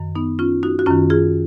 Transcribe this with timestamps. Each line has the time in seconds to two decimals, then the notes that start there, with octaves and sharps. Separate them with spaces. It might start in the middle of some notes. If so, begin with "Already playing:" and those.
Already playing: F#2 D#3
0.15 B3 D#4
0.39 C#4 F4
0.63 D#4 F#4
0.79 F#4
0.86 F#2 D#3 C#4 F4
1.10 F4 G#4